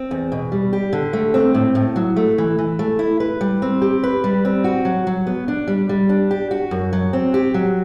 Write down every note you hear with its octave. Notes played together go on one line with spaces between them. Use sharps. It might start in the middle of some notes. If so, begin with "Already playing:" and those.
Already playing: C4
E2
B2
G3
G4
D3
A3
C4
A2
A2
F#3
A3
E3
E3
A3
E4
B4
G3
C4
G4
B4
G3
C4
F#4
F#3
F#3
B3
D4
G3
G3
D4
G4
F#4
F#2
F#3
C4
G4
F#3